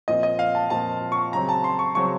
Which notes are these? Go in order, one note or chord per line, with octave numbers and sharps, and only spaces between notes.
A#2 F3 C4 F4 D#5
D#5
F5
A5
A#2 F3 C4 F4 A5
C#6
C#3 F#3 C4 A#5
A5
C6
C#6
C#3 F#3 C4 C#6